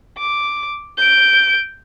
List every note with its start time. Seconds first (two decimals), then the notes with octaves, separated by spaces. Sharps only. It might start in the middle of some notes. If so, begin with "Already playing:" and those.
0.18 D6
0.98 G6 D7